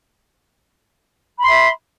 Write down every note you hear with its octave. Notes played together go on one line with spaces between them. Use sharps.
E5 B5 C6